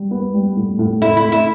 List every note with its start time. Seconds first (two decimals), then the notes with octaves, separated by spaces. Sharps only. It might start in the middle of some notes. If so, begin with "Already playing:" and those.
Already playing: G3
0.11 B3
0.34 G3
0.57 A2
0.79 A2
1.01 A3 E4
1.17 E4
1.25 A3
1.32 E4